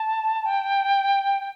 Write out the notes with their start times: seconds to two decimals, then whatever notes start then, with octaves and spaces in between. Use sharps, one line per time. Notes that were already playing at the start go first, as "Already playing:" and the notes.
Already playing: A5
0.46 G5